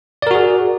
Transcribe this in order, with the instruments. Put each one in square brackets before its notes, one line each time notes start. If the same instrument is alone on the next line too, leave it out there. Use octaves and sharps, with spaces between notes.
[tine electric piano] D5
A#4
F#4
G#4